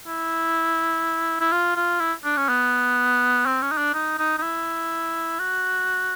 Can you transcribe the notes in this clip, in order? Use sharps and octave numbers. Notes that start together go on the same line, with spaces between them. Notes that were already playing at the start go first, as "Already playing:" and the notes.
E4
E4
F4
F4
E4
D4
C#4
B3
C4
C#4
D#4
D4
D#4
D#4
D#4
E4
F#4